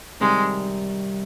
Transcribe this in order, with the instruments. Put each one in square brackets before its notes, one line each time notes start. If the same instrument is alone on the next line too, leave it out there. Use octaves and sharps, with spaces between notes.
[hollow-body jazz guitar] C3 D#3 G3 C4 [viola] G#3